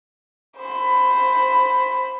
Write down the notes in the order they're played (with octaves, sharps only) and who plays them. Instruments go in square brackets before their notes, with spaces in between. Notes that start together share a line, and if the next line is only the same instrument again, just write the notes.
[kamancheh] C5 B5